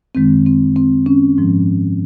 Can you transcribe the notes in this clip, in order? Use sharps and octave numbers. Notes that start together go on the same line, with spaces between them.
F#2 D#3 G#3 C4
C4
C4
C#4
G#2 F3 G#3